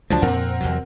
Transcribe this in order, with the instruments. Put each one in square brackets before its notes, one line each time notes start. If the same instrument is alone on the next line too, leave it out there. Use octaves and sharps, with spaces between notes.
[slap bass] C#2 F#3 G#3 [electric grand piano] F3 D4 A5
[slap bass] F2 A#2 [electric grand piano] C4 A#4 F#5
[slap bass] E2 C3 F#3